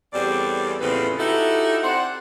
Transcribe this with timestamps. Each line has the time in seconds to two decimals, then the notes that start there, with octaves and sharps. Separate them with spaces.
0.13 E2 G3 C4 A4 C#5 D5
0.80 E2 A2 C#3 F3 C4 B4
1.18 D#4 E4 F#4 G4 A4
1.82 C4 C5 D5 F#5